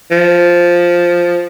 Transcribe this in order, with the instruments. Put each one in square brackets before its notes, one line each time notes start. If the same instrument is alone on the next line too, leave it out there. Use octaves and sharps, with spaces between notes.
[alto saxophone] F3